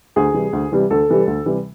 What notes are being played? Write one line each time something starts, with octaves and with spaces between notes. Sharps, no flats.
D2 G#4
C3 E3 G3
D2
C3 E3 G3
D2 A4
C3 E3 G3
D2
C3 E3 G3